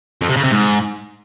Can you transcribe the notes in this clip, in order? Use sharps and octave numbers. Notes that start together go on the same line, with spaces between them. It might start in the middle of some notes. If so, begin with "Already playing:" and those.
F2
C3
C#3
C3
G#2